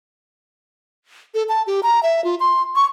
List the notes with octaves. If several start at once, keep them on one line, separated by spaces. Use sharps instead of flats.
A4
A5
G4
A#5
E5
F4
C6
C#6